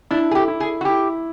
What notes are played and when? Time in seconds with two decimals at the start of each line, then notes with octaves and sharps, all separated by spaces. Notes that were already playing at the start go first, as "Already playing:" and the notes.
0.11 D4 E4
0.31 G#4
0.35 G4
0.48 E4
0.60 G#4
0.81 F#4
0.85 E4 G4